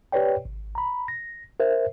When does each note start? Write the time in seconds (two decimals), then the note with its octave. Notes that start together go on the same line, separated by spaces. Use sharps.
0.12 G4 B4 C#5 D5 G5
0.45 G#1
0.75 A#5 B5
1.08 A#6
1.60 A#4 C5 E5